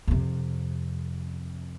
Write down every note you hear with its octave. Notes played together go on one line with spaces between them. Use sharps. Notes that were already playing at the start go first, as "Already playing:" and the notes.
F2 C3